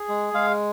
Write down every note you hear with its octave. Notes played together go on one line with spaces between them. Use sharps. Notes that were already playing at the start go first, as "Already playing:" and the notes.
Already playing: G#4
G#3
G#3 F5